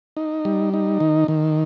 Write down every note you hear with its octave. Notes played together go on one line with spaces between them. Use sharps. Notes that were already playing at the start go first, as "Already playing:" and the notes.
D#4
G3
D#4
D#3
D#3